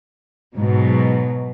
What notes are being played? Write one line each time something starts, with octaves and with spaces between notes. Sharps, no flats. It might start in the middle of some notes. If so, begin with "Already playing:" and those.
G#2 B2 F#3